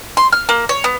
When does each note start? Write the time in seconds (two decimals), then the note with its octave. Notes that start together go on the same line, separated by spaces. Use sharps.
0.17 C6
0.32 F6
0.49 A#3
0.69 C#5
0.84 B3